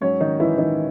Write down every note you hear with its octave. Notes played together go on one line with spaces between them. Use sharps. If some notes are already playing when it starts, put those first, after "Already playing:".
G#2 F#3 C#4 C#5
D#3 D#4
E3 E4
D#3 D#4